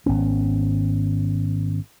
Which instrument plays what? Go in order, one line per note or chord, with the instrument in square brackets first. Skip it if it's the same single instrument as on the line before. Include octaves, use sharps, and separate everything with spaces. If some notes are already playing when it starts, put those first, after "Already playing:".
[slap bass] G#1 B3 C#4